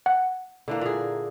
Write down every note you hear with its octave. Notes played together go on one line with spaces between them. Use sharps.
F#5
D3 E3 A#3
A#2 G#4